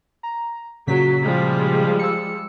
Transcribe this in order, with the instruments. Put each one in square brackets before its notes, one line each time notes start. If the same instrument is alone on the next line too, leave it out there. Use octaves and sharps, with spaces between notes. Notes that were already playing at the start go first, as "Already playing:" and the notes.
[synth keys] A#5
[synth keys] A#2 C#3 B6 [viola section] F#3
[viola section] F3 G3 G#3
[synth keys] E6 C#7